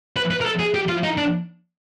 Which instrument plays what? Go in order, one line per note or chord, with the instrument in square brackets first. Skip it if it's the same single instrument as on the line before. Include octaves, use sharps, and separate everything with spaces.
[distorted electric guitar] B4
B4
A#4
A4
G#4
G4
F4
D#4
D4